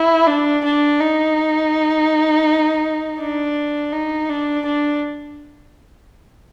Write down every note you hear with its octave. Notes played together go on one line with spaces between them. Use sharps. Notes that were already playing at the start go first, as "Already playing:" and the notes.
Already playing: E4
D4
D4
D#4
D4
D#4
D4
D4